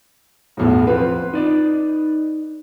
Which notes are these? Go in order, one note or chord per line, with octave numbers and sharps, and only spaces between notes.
B1 E2 A2
C4 F4 B4
D#4 D5 D#5